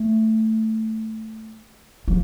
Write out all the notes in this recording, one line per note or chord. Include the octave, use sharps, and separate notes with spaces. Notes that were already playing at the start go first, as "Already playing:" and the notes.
Already playing: A3
F3